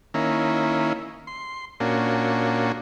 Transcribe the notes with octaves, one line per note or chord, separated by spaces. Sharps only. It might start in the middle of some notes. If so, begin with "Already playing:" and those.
D#3 A#3 C#4 E4
C6
A#2 A#3 C#4 D4 F#4